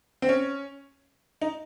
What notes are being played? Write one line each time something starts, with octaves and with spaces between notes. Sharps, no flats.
C4
C#4
D#4